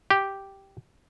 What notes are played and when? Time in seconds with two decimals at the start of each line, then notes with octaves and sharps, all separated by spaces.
0.11 G4